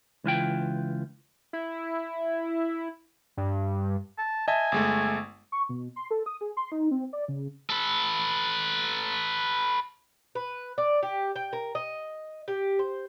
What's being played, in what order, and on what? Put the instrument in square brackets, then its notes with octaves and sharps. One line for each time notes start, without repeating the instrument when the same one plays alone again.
[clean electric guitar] C#2 E3 F4 G5
[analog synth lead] E4
G2
[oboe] A5
[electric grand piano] D#5 E5 A5 [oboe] G#5
[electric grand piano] G1 G#3 A3
[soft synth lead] C#6
B2
C6
A4
D#6
G#4
C6
D#4
C4
D5
C#3
[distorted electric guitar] A4 B4
[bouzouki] B4
D5
G4
G5
A#4
D#5
G4
C5